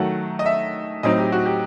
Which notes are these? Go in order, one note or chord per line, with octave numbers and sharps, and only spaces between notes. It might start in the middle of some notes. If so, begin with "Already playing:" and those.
Already playing: D#3 F#3 A3 F#5
D#5
E5
A2 F#3 C4 D#4 D#5
G4
F#4
G4